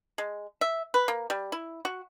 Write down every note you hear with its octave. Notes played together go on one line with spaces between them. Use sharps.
G#3
E5
B4
A#3
G3
E4
F#4